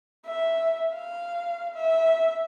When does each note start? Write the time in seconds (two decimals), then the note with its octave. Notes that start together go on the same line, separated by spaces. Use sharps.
0.27 E5
0.92 F5
1.75 E5